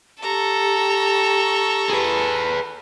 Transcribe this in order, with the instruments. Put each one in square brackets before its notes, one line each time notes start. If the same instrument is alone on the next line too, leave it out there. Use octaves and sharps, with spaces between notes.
[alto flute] G4 [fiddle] A4 [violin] A#5 C#6
[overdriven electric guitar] G#4 B4